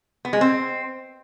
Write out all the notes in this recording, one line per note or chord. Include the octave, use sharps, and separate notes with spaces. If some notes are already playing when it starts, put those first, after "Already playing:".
B3
G#3
C4